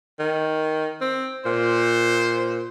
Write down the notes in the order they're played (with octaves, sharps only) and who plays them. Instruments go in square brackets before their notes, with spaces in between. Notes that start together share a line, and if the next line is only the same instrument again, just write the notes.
[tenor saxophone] D#3
C4
[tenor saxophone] A#2 [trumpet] C5